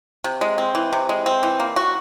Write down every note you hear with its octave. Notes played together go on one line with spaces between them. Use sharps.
C3
G#3
C4
E3
C3
G#3
C4
E3
A#3
F#4